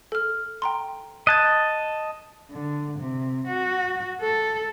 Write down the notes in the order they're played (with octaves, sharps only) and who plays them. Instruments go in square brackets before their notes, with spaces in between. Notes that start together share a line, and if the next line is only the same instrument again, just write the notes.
[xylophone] A4 F6
G5 A#5 C6
[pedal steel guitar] D#5 A5 [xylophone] F#6 G#6
[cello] D3
C3
F#4
A4